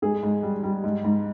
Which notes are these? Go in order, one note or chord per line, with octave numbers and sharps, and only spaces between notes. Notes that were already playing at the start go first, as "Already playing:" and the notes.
G#2 G#4
G#2
G3
G3
G#2
G#2